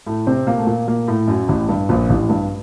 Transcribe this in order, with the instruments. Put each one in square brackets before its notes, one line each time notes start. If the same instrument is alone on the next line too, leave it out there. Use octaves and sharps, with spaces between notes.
[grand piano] A2 A3
C3 C4
A#2 A#3
A3
A#2 A#3
A#2 A#3
A2 A3
F#2 F#3
A1 A2
G2
A#1 A#2
A1 A2
G2